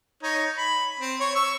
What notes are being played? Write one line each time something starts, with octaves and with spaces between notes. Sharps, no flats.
D#4 C#5
B5
C4
C#5
C#6 E6